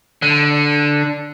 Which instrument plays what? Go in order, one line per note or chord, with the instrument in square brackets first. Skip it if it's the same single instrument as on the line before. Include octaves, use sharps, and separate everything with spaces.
[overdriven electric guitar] D3